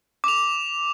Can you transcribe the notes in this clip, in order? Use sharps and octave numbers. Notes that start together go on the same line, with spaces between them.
D6 F7